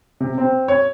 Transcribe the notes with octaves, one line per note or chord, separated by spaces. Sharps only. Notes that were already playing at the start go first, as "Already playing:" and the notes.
C3
C4
C#5